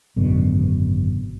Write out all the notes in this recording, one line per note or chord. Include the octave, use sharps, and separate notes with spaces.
G#1 F#2 B2 D3